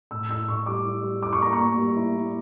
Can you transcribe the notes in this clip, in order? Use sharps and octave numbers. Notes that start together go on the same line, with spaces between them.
A2 E6
E4 E6
A2 C#6
G3 D6
E4
G3
E4 D6
C#6
A#3 A#5
C#6
A#3
G3
E4
A#3